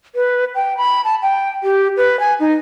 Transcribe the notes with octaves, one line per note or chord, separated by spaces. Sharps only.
B4
G5
B5
A5
G5
G4
B4
G#5
D#4